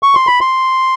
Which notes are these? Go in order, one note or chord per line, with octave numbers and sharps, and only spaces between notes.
C#6
C6
B5
C6